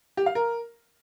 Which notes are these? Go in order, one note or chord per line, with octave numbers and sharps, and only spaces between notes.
G4
F5
A#4